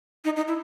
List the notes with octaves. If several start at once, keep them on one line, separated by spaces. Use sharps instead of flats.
D#4
D#4
E4